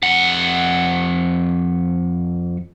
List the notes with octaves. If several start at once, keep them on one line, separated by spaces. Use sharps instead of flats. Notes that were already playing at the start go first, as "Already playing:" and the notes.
F2 F#5